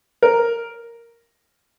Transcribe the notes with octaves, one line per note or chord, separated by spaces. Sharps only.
A#4